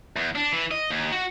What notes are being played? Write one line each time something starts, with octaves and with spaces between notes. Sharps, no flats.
E2
D4
E3
D#5
D#2
F#4